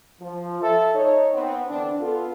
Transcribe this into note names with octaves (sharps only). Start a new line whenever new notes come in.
F3
A4 E5 A5
D#4 C#5
B3 C4
D3 E3 B3 C4 D4
B3 F4 A4